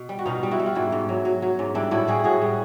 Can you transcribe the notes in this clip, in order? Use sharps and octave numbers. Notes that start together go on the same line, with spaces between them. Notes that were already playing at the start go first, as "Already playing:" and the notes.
Already playing: B2 B3
G3
F#4
B2 D#4 F4
G3
E4 F#4
G3
F4
G#2 E4 F#4
G#2
F#3
F#3
F#3
G#2
G3 D4 E4
A2 E4 F#4
G3 F#4 G#4
A2 F#4 G#4
G3